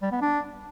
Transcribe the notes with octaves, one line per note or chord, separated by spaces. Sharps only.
G3
B3
D4